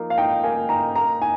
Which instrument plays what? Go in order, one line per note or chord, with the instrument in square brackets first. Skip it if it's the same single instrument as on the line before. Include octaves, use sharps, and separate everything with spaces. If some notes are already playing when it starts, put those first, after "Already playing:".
Already playing: [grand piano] F3 A#3 D#4
[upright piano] F5
[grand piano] D#4 [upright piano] G5
[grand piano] A#3 [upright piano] G#5
[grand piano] D#4 [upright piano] A#5
[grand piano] A#3 [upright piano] A#5
[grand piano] D#4 [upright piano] G#5